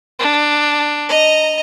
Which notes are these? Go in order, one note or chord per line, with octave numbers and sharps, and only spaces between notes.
D4
D#5 A#5